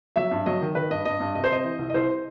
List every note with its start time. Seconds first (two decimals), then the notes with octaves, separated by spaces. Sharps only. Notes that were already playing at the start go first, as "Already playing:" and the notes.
0.16 F#3 E5
0.31 G2
0.46 F#3 D#5
0.61 D#3
0.75 D#3 B4
0.90 G2 D#5
1.05 G2 D#5
1.20 G2
1.35 C3 D#5
1.44 C5
1.49 C3 D#5
1.64 E3
1.79 C2
1.90 D#5
1.94 C2 C5